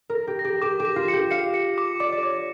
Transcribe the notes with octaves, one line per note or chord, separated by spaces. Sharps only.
A#4
A#6
G4
A#6
G4
G4 D6
G4
D6
F4
G4 C#7
F5 C#7
C#7
D6
D5 D6
D5
C#5 D6